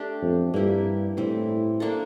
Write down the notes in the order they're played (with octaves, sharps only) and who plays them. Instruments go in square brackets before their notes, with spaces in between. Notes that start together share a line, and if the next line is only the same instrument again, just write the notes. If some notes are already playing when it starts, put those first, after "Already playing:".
Already playing: [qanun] A3 D4 G4
[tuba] F2
[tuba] G2 [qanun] A#3 E4 G4
[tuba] A2 [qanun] E3 G3 C4 E4
[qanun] A#3 D4 A4